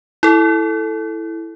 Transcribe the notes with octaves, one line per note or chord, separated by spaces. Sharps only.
E4 A4